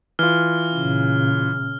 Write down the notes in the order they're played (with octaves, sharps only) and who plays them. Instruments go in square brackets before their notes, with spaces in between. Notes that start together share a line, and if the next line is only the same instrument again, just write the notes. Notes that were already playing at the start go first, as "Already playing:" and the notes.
[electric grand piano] E3 F4 [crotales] F6
[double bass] A#2 C#3